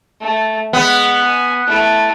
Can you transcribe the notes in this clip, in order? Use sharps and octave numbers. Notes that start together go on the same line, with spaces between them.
A3
G#3 B3
G#5
A3 E4